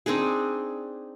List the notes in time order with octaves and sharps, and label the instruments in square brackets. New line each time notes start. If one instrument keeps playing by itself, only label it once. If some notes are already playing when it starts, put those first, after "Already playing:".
[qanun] C4 D4 D#4 G#4